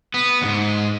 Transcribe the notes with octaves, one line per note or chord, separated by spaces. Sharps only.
B3
D2 G#2